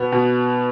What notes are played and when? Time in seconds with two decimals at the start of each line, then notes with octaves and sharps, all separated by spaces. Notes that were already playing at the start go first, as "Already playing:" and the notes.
Already playing: B2 B3
0.12 B2